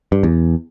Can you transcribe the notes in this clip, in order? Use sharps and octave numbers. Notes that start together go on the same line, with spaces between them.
G2
E2